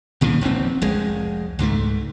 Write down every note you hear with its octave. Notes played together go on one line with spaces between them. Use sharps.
C2 A#2 D#3 E3
E1 A#1 A2 C4
F1 C2 G#3
C#2 G#2 F3 A3